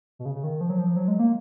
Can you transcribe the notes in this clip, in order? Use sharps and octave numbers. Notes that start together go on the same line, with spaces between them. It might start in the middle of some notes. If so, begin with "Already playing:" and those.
B2
C#3
C#3
D#3
F3
F#3
F3
F#3
G#3
A#3